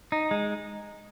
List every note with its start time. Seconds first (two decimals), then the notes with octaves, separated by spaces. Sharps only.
0.12 D#4
0.31 G#3